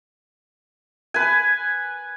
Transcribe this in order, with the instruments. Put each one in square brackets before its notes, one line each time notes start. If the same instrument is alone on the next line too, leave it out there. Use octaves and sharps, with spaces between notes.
[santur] B4 G#5